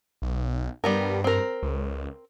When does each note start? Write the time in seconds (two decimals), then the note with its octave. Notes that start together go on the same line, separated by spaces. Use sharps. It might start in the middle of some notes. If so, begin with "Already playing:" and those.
0.22 B1
0.84 G2 G3 B3 A#4
1.24 C4 A#4
1.63 C#2